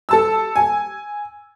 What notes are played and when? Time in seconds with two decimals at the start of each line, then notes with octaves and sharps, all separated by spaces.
0.09 A4 A5 E6
0.56 G#5